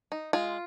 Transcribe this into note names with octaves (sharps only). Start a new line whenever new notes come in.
D#4
G#3 F4